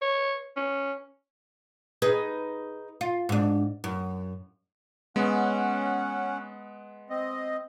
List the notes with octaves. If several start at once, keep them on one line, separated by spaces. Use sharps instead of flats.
C#5
C#4
D#4 G#4 B4
F4
G#2 D4
F#2
G#3 B3 C#4 F#5
C4 D#5